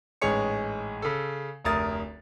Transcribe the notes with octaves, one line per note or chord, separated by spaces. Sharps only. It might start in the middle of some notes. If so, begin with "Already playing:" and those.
A1 G#2 G#3 G#4 C#5 C#7
C#3 A4
F1 D2 A#4 E5 D#6 A6